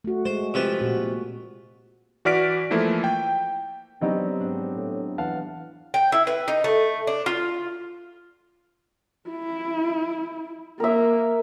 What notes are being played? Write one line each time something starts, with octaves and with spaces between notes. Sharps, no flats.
A3 F#4
G#3 C5
C3 F3 B4
A#2 F#4
E3 F#4 D5 F6 B6 D7
E3 F3 A3 A#3 E4
G5
F#3 B3 C4 D4 D#4 G4
G#2 D4
A2
E3 F5 F#5 A5
G5
E4
B4
D#4
A3
D4
F4
E4
A#3 A#4 E5